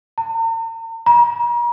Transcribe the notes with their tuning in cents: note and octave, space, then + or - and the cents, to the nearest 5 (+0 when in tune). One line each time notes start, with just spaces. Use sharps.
A#5 -45
A#5 +40